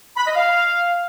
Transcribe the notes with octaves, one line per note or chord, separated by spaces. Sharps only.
B5
D#5
F5